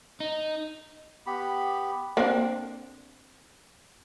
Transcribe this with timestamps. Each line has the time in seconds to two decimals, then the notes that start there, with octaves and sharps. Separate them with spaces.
0.20 D#4
1.26 B3 G4 B5
2.17 A#3 C4 D4